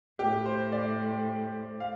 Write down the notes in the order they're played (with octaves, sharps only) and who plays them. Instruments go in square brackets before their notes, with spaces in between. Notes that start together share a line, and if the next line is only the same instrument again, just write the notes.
[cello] A2 [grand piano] G4
[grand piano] C5
D5
F5